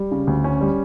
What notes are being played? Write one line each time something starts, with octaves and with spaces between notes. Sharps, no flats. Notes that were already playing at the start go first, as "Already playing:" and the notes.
Already playing: G3
C#3
D2
C#4
G3